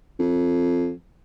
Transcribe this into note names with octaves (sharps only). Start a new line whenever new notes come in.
F2